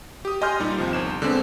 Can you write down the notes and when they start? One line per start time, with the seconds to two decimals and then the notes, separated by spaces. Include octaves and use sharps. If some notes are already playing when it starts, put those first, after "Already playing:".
0.25 G4 D#6
0.41 G4 D#5 G#5 C6 F6 G6
0.60 A#2 G3 D#4
0.78 D#2 C3 F3
0.93 G1 E7
1.22 D3 G#3 B3 C4